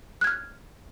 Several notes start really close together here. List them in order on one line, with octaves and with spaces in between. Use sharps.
F#6 G#6 F6